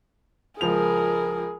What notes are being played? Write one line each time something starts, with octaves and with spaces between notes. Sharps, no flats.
C#2 F3 G#4 A#4 F7